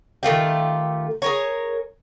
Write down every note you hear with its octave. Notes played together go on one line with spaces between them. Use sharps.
D#3 A3 F4 G4
G#4 A#4 C#5